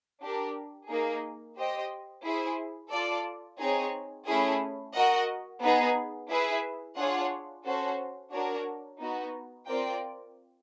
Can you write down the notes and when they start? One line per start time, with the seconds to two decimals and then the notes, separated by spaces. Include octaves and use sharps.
0.22 D4 G4 A#4
0.89 A#3 D#4 G#4
1.57 G4 C5 D#5 G5
2.25 E4 G#4 C5
2.91 F4 A4 D5
3.59 C4 D#4 G#4 C#5
4.26 A3 C#4 E4 G#4
4.94 F#4 A#4 D#5 F#5
5.62 B3 D#4 G#4
6.30 E4 G#4 B4 E5
6.97 D4 F4 G#4 C#5 F#5
7.65 C#4 F#4 A4 C5
8.32 D4 F#4 A#4 C#5
9.00 B3 D#4 F#4
9.68 C4 F4 A#4 D5 G5